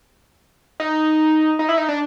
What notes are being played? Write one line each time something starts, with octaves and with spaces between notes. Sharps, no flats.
D#4
D#4
E4
D#4
D4